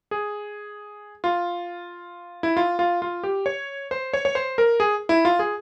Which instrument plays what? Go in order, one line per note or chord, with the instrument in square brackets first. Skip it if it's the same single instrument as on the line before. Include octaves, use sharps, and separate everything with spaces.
[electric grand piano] G#4
F4
E4
F4
F4
F4
G4
C#5
C5
C#5
C#5
C5
A#4
G#4
E4
F4
G#4